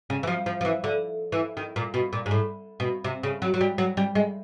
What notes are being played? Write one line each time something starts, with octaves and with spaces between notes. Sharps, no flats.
C#3
E3
F3
F3
F3
E3
D3
E3
D#3
A#2
B2
A#2
G#2
A2
B2
C3
C#3
F#3
F#3
G3
F#3
G3
G#3